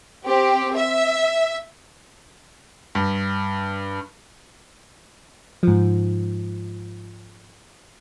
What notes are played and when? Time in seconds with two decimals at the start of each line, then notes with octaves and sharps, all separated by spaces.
0.25 C4 G4
0.74 E5
2.95 G2
5.63 G#2 F3